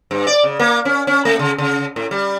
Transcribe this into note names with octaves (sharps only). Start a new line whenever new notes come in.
G2
D5
C#3
A#3
C#4
C#4
A3
C#3
C#3
A2
G3